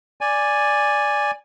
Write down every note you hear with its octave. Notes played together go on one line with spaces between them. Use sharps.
D5 G#5